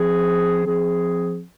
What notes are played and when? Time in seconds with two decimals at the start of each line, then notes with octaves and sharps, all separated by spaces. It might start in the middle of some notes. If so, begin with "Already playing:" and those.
Already playing: F3 C4 G#4
0.65 F3 C4 G#4